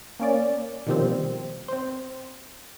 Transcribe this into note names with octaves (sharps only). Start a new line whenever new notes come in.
A#3 C#4 D5
B2 D#3 F3 G3 A#3 C4
C4 C5